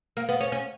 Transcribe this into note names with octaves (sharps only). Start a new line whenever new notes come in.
A#3
B3
C#4
C#4